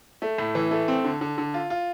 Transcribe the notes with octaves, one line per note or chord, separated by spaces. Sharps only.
A3
A2
E3
A3
C4
D3
D3
D3
F4
F4